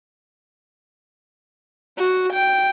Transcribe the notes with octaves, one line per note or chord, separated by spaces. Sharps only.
F#4
G5